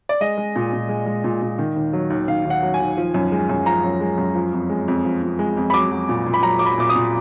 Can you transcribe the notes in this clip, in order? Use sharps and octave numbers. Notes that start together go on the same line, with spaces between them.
D5
G#3 D#5
G#3
A#2
A#2
G#3
G#3
A#2
A#2
D#3
D#2
F#3
D#2
D#3 F5
D#2
F#5
F#3
G#5
D#2
F3
F#2
G#3
F#2
F3 A#5
F#2
G#3
F#2
F3
F2
G#3
F2
F3
F2
G#3
F2
B5
F#3 D6
F#3
A#2
A#2
B5
F#3 A#5
F#3 D6
B5
A#2 D6
D#6
A#2